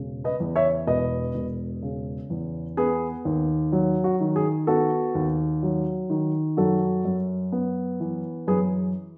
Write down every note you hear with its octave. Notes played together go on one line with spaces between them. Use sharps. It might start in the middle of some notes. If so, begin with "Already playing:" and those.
Already playing: E1 C#3
B4 D#5
E2
C#5 E5
E1 B4 D#5
E1
C#3
E2
B3 G#4 B4
D#2
F#3
F#4
D#3
G#4
B3 F#4 A4
D#2
F#3
D#3
F#2 F#4 A4
F#2
B3
E3
F#2 G#4 B4